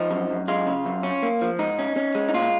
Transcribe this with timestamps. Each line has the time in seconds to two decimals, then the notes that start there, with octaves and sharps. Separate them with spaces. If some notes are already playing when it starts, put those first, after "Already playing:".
Already playing: F3 D#4
0.11 F#2
0.30 F#2
0.48 G#3 F4
0.67 C#3
0.85 F#2
1.03 C#4
1.23 A#3
1.42 F3
1.59 G#2 D#4
1.79 C#4
1.96 C#4
2.15 G#3
2.29 D#4
2.34 A#2 F4